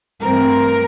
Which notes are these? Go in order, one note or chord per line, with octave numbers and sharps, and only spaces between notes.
G2 E3 A3 C4 A#4